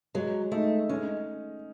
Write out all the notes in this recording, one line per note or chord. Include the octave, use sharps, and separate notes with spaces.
F#3 G#3
A3 D#4
G#3 C#4